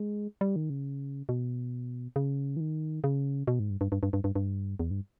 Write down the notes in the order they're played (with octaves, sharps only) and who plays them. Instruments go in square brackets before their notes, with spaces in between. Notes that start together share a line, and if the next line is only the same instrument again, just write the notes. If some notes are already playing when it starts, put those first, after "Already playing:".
Already playing: [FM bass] G#3
G3
D#3
C#3
B2
C#3
E3
D#3
C#3
B2
G#2
G2
G2
G2
G2
G2
G2
G2
E2
G2